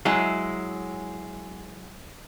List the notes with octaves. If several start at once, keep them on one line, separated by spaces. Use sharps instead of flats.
F#3 G#3 E4